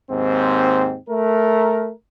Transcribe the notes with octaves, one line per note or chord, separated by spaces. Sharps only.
D#2 G#2 C4
A3 A#4